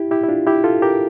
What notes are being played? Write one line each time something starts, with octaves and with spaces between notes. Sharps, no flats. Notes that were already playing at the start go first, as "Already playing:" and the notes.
Already playing: E4 G4
E4 G4
E4
D4 F4
E4 G4
F4 A4
G4 A#4